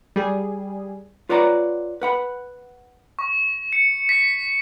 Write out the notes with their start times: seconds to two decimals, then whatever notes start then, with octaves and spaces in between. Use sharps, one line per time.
0.16 G3 G#4
1.29 F4 B4 C#5 D5 F#5 A#5
2.02 B4 F#5 B5
3.19 C#6
3.72 C#7
4.09 B6